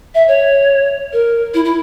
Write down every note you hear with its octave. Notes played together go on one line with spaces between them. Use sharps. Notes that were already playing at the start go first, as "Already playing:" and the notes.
E5
C#5
A#4
E4
E4